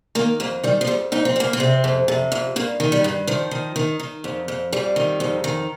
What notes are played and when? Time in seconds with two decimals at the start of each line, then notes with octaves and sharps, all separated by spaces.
0.15 D#3 A#3
0.40 F2 A#3
0.63 D#3 G3
0.81 F3
0.87 F2 G3
1.12 F2 D#4
1.25 C4
1.36 F2 A#3
1.53 C4
1.60 C3
1.84 F2
2.08 C3
2.32 F2
2.56 G2 A#3
2.80 D#3
2.92 G3
3.04 G2
3.27 D#3 F3
3.51 D#3
3.76 D#3
4.00 D#3
4.24 F2
4.48 F2
4.73 F2 G3
4.96 D#3
5.20 F2
5.44 D#3